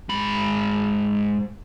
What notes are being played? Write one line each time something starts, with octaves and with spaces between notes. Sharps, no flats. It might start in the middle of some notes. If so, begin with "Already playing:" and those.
G#2 B5